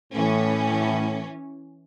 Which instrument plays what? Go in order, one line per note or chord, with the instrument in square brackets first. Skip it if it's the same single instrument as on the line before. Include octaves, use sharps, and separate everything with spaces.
[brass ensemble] A2 [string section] E3 C#4